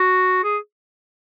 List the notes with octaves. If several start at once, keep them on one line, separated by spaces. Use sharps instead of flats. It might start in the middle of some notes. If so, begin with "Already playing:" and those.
Already playing: F#4
G#4